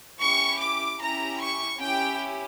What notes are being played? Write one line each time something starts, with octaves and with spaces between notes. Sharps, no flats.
C#4 E4 G4 C#6
D6
C#4 E4 G4 A#5
C#6
C#4 E4 G4 G5